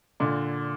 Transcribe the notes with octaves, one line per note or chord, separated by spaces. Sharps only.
A#2 D3